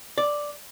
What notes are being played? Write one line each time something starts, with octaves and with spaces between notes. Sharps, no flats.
D5